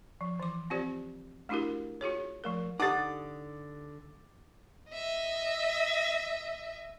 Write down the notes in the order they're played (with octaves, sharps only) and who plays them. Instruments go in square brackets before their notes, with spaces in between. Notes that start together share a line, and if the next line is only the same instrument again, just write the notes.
[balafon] F3
E3 D6
C4 F4 G4 C5 D5
A3 D4 E4 F#4 G4 A#4
F4 F#4 G#4 C#5
F3 A3 A#4
[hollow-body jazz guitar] D3 D#5 F#5 [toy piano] D#4 G4 A4 [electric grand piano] D6 A6
[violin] D#5 E5